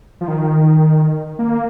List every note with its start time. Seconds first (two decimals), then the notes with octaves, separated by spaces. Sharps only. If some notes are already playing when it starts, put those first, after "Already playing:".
0.21 F3
0.28 D#3
1.39 A#3